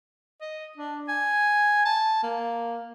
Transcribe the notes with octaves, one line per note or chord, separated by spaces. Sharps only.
D#5
D4
G#5
A5
A#3